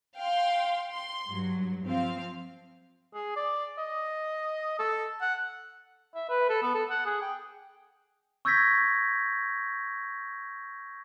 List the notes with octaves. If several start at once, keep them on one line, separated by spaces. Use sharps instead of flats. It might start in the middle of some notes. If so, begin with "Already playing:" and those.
F5 G5 C6
C6
G2 F#3
F3 C4 F5
G#4
D5
D#5
A4
F#5
E5
B4
A4
B3
A4
F#5
G#4
G5
C#6 E6 G6 G#6 A#6 B6